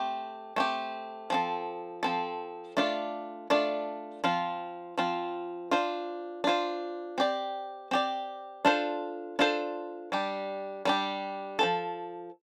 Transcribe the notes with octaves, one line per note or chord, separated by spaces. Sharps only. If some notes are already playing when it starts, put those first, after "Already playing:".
Already playing: A3 C4 G4
A3 C4 G4
F3 C4 A4
F3 C4 A4
A3 D4 F4 D5
A3 D4 F4 D5
F3 C4 F4
F3 C4 F4
D4 F4 C5
D4 F4 C5
C4 G4 D5
C4 G4 D5
D4 F4 A4 C5
D4 F4 A4 C5
G3 D4 G4
G3 D4 G4
F3 C4 A4